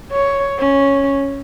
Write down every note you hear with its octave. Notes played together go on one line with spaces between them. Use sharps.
C#5
C#4